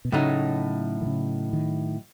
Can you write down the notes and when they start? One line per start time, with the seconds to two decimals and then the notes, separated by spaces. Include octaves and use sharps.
0.05 B2
0.12 A2 C#3 F#3 A3 D#4
1.01 D#3
1.06 C#3
1.53 D#3